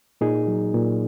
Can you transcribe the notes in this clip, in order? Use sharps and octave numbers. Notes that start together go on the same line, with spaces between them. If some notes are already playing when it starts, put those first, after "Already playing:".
A#2 D#4 G#4
F#3
A#2